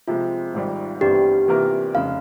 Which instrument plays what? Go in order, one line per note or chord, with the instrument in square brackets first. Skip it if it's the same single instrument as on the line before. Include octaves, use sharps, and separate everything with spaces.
[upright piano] C3 F3 G#3 [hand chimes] F4
[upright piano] G#1 G#2 G3
[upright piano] G1 G2 E3 G3 C4 [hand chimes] G4
[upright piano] C3 E3 A#3 F4 A#4
[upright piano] F1 C#3 [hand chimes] F5